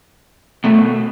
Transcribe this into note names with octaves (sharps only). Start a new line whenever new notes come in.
B2 A3